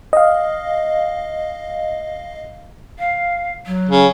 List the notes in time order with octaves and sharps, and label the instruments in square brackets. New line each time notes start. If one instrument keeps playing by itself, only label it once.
[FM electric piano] D#5 F5
[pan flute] F5
F#3
[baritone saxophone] C#3